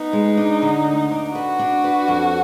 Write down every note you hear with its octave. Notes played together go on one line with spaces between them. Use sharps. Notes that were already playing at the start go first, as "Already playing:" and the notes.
Already playing: B3 D#4
G#3
D4
D3
D2
D4
F#4 B4
D4
B4
F2